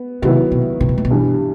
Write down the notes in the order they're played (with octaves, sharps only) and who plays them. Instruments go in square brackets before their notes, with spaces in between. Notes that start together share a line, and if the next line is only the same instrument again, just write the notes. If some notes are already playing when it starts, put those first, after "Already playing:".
Already playing: [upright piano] B3
[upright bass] C3 [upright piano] D#3 F#3 B3 E4
[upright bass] B2
C3
B2
A#2
B2
[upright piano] G2 E3 G3